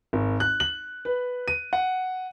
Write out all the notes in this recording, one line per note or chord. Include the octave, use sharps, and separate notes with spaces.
G#1
F#6
F#7
B4
D#7
F#5